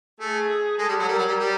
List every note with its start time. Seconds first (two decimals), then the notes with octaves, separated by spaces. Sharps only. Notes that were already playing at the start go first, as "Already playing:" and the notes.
0.20 A3 G#4
0.79 G#3 A4
0.89 G3
1.00 F#3
1.08 G3 A#4
1.18 F#3
1.28 G3
1.39 G3